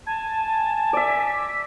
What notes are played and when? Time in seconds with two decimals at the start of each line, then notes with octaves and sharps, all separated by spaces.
0.07 G#5 A5
0.93 D5 E5
1.08 B6